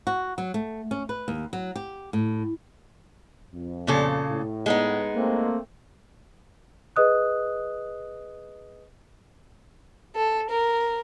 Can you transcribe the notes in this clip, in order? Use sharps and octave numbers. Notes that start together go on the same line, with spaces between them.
F#4
F#3
A3
C#4
B4
D#2
F#3
G4
A2
F2
A#2 C#3 A4
A2
G#3 B3 D#4
A3 A#3 C4
G#4 B4 D#5 D#6 F#6
A4
A#4